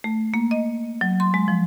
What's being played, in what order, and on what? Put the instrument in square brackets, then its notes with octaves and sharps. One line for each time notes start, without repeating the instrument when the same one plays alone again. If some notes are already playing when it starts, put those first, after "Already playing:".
[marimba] A3
A#3
D#5
F#3
C6
G#3
F3